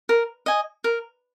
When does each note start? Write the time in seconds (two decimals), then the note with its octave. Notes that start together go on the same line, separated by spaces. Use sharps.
0.09 A#4
0.46 D#5 G#5
0.84 A#4